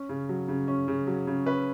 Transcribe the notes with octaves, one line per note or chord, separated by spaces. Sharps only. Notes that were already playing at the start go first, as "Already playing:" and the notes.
Already playing: C#4
C#3
F#3
C#3
C#4
C#3
F#3
C#3
C#4 B4